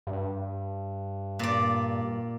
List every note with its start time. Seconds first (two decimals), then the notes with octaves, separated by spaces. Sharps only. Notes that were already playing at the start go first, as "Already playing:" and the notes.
0.07 G2
1.39 A#2 D5